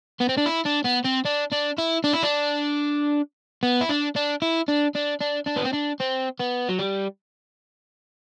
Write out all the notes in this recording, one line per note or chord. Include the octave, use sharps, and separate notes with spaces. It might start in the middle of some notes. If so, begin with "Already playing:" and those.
B3
C4
D4
E4
D4
B3
C4
D4
D4
E4
D4
E4
D4
B3
E4
D4
D4
E4
D4
D4
D4
D4
B3
C4
D4
C4
B3
F#3
G3